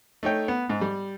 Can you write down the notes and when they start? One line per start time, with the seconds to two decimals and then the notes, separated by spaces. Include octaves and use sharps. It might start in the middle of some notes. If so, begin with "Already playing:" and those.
0.23 A3 D#4 C#5 G5
0.48 B3
0.69 G#2
0.81 G3